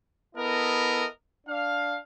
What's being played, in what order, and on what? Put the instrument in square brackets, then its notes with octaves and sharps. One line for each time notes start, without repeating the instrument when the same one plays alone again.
[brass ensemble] B3 E4 A4 A#4 D#5
D4 F5